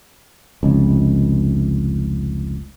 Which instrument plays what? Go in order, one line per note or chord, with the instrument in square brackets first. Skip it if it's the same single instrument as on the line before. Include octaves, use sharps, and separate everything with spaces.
[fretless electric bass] F1 C#2